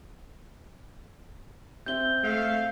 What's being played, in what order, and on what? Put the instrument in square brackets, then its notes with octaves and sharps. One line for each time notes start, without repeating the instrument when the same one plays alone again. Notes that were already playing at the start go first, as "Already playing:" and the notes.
[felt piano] C4 E5 [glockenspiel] G6 G7
[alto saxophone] A3 [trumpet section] F5